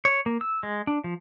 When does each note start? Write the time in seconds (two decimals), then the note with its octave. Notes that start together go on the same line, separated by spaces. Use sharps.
0.05 C#5
0.26 A#3
0.41 E6
0.63 G#3
0.87 D4
1.04 F3